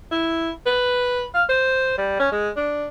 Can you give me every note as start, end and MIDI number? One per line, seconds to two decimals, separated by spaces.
0.11 0.50 64
0.66 1.25 71
1.34 1.43 77
1.49 1.97 72
1.98 2.15 55
2.20 2.29 61
2.32 2.49 56
2.56 2.87 62